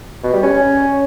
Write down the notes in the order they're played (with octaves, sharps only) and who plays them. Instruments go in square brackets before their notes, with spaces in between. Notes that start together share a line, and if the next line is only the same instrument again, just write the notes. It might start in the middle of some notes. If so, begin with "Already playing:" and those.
[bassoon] B2
G3
C#4